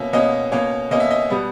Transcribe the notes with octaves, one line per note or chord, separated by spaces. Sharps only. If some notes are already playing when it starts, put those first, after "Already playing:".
Already playing: B2 A#3 C#4 E5
B2 A#3 C#4 D#5
B2 A#3 C#4 C#5
B2 A#3 C#4 D#5
E5
D#5
B2 G3 B3